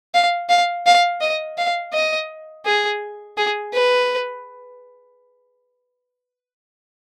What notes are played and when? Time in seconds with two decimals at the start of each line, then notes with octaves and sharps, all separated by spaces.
0.14 F5
0.49 F5
0.86 F5
1.21 D#5
1.58 F5
1.93 D#5
2.66 G#4
3.37 G#4
3.73 B4